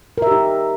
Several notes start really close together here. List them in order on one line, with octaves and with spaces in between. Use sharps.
A#4 E5 G4 D#4